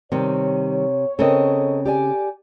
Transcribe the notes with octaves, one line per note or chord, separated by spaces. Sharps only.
C3 D#3 G3 C#5
C#3 C4 A4 A#4 D#5
G4 D5 G#5